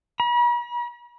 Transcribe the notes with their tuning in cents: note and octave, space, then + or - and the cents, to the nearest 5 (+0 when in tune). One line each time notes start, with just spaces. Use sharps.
B5 -45